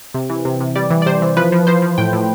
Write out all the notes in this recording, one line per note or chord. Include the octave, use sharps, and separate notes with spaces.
C3
E3
C3
C3
G3 D5
E3
D5
C3 C5
E3
F3 B4
F3
F3 C5
F3
A2 G5
A2